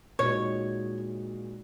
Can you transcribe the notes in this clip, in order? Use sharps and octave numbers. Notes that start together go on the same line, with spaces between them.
A#2 G#3 D#4 F#4 C#5